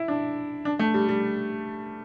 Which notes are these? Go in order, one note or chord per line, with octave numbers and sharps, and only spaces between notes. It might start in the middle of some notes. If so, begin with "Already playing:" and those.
Already playing: E4
D4
D4
A3
G3
G3